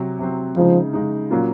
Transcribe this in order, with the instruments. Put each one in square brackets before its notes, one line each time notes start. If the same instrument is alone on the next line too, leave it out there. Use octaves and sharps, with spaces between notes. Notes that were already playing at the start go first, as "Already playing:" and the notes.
Already playing: [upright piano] C3 F#3 C4
C3 F#3 C4
[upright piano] C#3 G#3 D#4 [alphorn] F3
[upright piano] C#3 G#3 D#4
A#2 F#3 A#3 C#4 F4